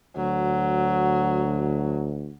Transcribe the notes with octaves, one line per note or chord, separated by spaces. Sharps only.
D2 F#3